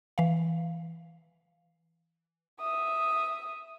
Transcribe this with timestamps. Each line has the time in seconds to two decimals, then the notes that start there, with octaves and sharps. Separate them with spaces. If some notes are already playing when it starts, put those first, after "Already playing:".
0.18 E3 F5
2.61 E5 D#6